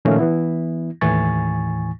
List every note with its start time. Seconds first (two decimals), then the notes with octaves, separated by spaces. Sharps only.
0.05 A#2 D#3 F3 A3 C#4 F5
0.19 E3 B3 E4
1.01 D#2 A2 E3 G#5 C#6 A6